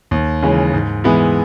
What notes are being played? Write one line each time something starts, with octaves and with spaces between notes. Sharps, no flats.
D#2
C#3 E3 G#3 C#4
G#2
E3 G#3 B3 E4